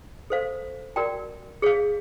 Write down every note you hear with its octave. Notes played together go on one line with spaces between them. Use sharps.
A4 C5 F5
F#4 A#4 D5 G5 A#5
G#4 C#5 F5